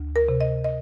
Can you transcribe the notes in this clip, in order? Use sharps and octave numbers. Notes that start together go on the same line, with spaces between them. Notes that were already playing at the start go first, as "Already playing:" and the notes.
Already playing: D2
A#4
C3
D#5
D#5